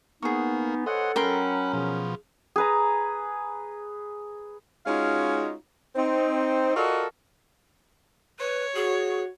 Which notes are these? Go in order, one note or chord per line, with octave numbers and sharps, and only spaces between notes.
A#3 B3 D#4 G#4 C#6
B3 A4 C5 C#5 D#5 F#5
F#3 C#4 A#4 F#5 G5 B5 C6
B2 F3 G#4
G#4 B4 A#5
G#3 C#4 D#4 F4 F#4 F5
C4 D#4
F4 F#4 A4 A#4 D5 D#5
B4 C#5
F#4 G#4